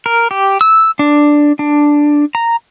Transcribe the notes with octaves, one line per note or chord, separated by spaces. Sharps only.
A#4
G4
E6
D4
D4
A#5